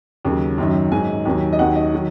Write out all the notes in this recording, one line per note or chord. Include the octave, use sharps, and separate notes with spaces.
D#2 C#3 F#3
F#2 D#3 F#3
G#2 D#3 F#3 G#5
D#2 D#3 F#3
D#5
D#2 D#3 F#3 F#5
D#5
D#3 F#3